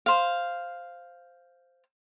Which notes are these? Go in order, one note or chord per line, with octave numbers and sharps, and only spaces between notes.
C5 F5